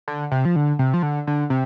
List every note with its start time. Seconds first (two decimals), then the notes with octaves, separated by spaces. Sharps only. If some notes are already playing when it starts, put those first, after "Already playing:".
0.08 D3
0.32 C3
0.45 F3
0.56 D3
0.79 C3
0.94 F3
1.03 D3
1.27 D3
1.50 C3